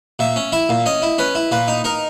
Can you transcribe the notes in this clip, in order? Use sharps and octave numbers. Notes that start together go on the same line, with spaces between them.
A#2 E5
C#4
E4 E5
A#2
C#4 D#5
E4
C#4 B4
E4
A#2 B4
D#4
D#4 A#4